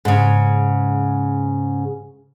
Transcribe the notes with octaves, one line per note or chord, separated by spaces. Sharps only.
G#2 C#3